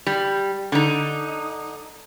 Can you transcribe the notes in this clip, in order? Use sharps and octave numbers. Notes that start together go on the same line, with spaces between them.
G3
D3 D#4